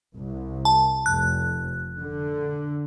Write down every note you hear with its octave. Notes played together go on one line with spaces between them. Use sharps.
C2
A5
F1 F#6
D3